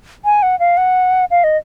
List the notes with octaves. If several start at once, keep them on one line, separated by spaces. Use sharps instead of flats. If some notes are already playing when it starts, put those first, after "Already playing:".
G#5
F#5
F5
F#5
F5
D#5